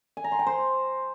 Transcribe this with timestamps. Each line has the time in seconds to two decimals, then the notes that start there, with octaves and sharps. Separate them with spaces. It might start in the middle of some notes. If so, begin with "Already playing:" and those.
0.17 G#5
0.24 A#5
0.32 C6
0.39 G5
0.47 C5